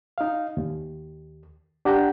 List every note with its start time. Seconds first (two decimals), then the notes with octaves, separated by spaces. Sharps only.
0.18 D#4 F5
0.57 D#2
1.85 D4 G4 F#5 G5 A#5